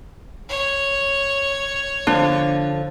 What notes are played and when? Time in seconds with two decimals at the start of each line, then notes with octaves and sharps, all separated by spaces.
0.49 C#5
2.07 D3 F3 D4